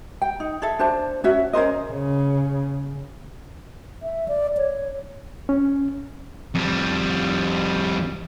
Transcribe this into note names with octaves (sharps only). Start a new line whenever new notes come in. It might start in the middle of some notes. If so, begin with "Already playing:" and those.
G5
D#4
G#4 A4 E5
D4 C5 A5
C#4 F#4 E5
C#4 A#4 C5 D#5
C#3
E5
D5
C#5
C#4
F2 G3